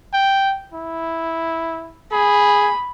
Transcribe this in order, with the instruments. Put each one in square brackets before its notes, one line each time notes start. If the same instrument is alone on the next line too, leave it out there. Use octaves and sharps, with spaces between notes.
[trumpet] G5
E4
[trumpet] G#4 [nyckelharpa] B5